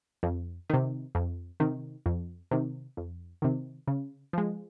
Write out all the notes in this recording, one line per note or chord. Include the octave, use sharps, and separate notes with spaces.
F2
C3 D#3
F2
C3 D#3
F2
C3 D#3
F2
C3 D#3
C#3
F3 G#3